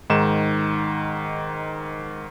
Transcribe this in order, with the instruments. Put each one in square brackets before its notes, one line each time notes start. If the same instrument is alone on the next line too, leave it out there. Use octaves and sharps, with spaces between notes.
[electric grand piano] G#2 D#3 E7